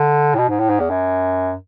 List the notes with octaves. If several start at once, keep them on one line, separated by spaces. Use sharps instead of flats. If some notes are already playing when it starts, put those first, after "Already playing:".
Already playing: D3
A2
B2
G#2
A2
G#2
E2
F#2